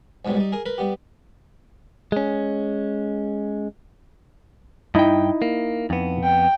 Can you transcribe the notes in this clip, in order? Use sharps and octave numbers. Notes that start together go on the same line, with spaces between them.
B1 G#2 B2 F#3 G3
G3 D#4
G#4 A#4 D#6
A#4 B4 B5
G3 B3 G4
G#3 C#4
G2 D#4 E4 D#5 G5
A#3
F2 B3
G5